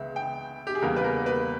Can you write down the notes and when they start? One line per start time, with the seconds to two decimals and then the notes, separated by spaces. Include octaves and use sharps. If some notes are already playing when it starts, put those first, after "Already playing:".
Already playing: C#2 C#3 G#3 B3 E5
0.16 G5
0.67 G4
0.75 G#4
0.82 E2 C#3 G3 A#3 A#4
0.96 B4
1.04 A#4
1.26 B4